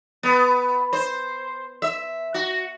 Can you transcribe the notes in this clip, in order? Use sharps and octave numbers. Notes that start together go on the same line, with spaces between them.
B3
C5
E5
F#4